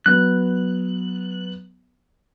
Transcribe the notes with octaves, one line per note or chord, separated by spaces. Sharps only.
F#3 B3 F#6